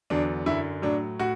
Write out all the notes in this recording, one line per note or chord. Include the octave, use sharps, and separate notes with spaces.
E2 D3 F#3 D4
F#2 D3 F#3 E4
A2 F#3 D4
A2 F#4